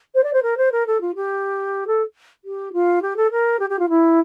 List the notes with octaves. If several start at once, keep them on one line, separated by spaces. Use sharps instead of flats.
C5
D5
C5
A#4
C5
A#4
A4
F4
G4
A4
G4
F4
G4
A4
A#4
G4
G4
F4
E4